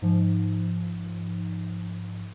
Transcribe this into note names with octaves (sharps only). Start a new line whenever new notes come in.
G#2 F3